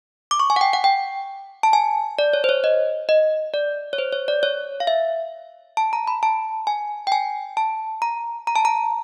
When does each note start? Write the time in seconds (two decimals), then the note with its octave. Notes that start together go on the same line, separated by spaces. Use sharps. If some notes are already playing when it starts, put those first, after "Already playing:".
0.31 D6
0.40 C#6
0.50 G#5
0.56 F#5
0.61 G5
0.73 F#5
0.84 G5
1.63 A5
1.73 G#5
2.19 D5
2.33 C#5
2.44 C5
2.49 C#5
2.64 D#5
3.09 D#5
3.54 D5
3.93 C#5
3.98 C5
4.12 C#5
4.28 D5
4.43 C#5
4.80 F5
4.87 E5
5.77 A5
5.93 A#5
6.07 B5
6.23 A5
6.67 G#5
7.07 G5
7.12 G#5
7.57 A5
8.02 A#5
8.47 A#5
8.56 A5
8.65 A#5